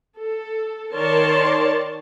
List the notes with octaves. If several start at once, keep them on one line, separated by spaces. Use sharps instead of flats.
A4
D#3 A#4 C#5 D5 A5 C6